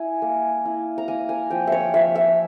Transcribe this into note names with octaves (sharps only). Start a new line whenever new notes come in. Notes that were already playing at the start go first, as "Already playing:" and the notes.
Already playing: E4 G#5
A#3
E4
A#5
A#3 G#5
G#5
F3 G5
C#5 E5
F3 E5
E5